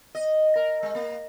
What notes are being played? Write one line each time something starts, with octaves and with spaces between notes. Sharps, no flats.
D#5
A#4
G#3
A#3